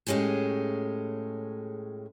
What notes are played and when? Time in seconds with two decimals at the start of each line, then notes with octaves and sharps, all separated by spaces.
0.07 A2 G#3 C#4 G4 G#4